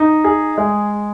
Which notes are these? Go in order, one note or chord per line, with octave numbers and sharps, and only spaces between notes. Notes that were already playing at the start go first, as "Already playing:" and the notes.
Already playing: D#4
G#4
G#3